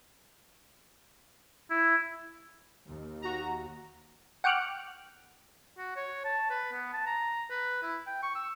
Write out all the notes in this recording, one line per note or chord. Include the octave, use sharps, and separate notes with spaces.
E4
D#2
F#4 A#5
F#5 G5 C#6 D6 F6 F#6
F#4
C#5
A5
B4
B3
A5
A#5
B4
E4
G5
C#6
E6